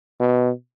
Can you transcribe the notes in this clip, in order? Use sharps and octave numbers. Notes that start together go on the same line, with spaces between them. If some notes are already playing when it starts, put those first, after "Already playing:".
B2